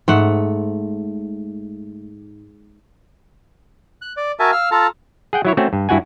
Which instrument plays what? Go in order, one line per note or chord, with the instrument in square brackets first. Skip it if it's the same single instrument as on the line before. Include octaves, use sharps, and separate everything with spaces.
[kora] G#2 A3 F#5
[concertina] F#6
D5
F#4 A#4 E5 G#5 A5
F5 E6 F6
F4 A4 A5 A#5
[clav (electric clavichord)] G#4 F#5 G5
F#3 E4 C#5
A3 C4 C#4 F#4
G2
G2 E4 F#4 F#5 G#5